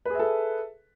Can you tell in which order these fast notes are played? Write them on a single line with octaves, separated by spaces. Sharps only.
B4 G#4 E5 A4